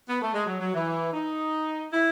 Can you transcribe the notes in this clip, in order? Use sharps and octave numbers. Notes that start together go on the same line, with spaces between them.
B3
A3
G#3
F#3
F#3
E3
D#4
E4